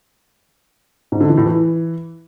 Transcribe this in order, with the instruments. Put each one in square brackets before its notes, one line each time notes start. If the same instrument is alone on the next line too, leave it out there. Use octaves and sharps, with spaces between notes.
[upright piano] G#2
D3
E3
A2
E3